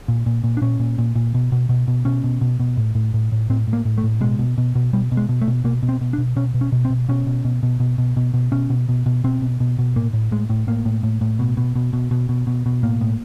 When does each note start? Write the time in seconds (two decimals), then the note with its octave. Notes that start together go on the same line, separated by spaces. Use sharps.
0.08 A#2
0.26 A#2
0.44 A#2
0.57 D4
0.62 A#2 C#4
0.80 A#2
0.98 A#2
1.16 A#2
1.34 B2
1.52 B2
1.69 B2
1.88 B2
2.05 B2 C#4
2.24 B2
2.41 B2
2.60 B2
2.77 A2
2.95 A2
3.14 A2
3.32 A2
3.50 A2 C4
3.68 A2
3.73 A#3
3.85 A2
3.98 A3
4.04 A2
4.21 B2 G#3
4.39 B2
4.58 B2
4.75 B2
4.93 B2 G3
5.12 B2
5.17 G#3
5.29 B2
5.42 A3
5.48 B2
5.64 B2 A#3
5.83 B2
5.89 C4
6.01 B2
6.13 D4
6.18 B2
6.36 B2 C#4
6.54 B2
6.61 C#4
6.72 B2
6.85 C4
6.90 B2
7.09 B2 C#4
7.27 B2
7.45 B2
7.63 B2
7.80 B2
7.98 B2
8.17 B2
8.34 B2
8.52 B2 C#4
8.70 B2
8.89 B2
9.06 B2
9.24 B2 C4
9.42 B2
9.60 B2
9.79 B2
9.96 A2 A#3
10.13 A2
10.31 A2 G#3
10.50 A2
10.67 A2 A#3
10.85 A2
11.03 A2
11.21 A2
11.39 B2
11.57 B2
11.76 B2
11.93 B2
12.11 B2
12.29 B2
12.47 B2
12.66 B2
12.83 A2 A#3
13.01 A2